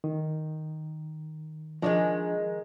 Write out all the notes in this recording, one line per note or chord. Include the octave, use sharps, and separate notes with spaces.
D#3
D#3 F3 F#3 G#3 D4